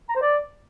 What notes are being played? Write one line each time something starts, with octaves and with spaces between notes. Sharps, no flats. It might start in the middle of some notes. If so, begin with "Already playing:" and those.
A#5
C5
D5